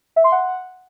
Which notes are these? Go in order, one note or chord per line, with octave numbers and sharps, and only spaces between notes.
E5
C6
F#5